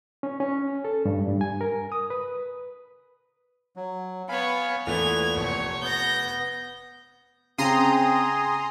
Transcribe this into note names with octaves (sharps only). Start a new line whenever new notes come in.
C#4
C#4
A4
G2
G2
G#5
A#4
D#6
B4
F#3
B3 C#5 F5 G#5 B5
E2 A#2 A3 B3 G#6 F7
F1 C#5
B3 G6 A#6
C#3 C4 G#4 A#5 C6 D#6